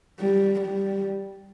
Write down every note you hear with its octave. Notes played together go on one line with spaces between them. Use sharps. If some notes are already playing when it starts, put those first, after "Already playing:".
G3
G3